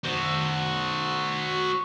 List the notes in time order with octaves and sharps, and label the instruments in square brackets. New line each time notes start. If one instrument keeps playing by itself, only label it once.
[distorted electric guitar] F#4 C5